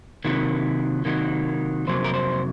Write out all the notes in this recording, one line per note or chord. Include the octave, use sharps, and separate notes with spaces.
C3 D#3 F#3 A#3
C3 D#3 F#3 A#3
F2 C3 F#3 A#3 C5
A#4
C5